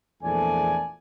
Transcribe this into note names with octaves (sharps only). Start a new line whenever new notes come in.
A#1 E2 A3 A4 D5 G#5